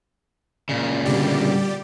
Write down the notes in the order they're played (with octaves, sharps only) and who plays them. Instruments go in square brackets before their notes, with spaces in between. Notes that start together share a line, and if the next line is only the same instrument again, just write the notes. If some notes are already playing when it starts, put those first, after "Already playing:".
[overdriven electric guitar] A#2 C#3
[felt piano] B2 D3 B3 [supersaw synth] G3 G4 D5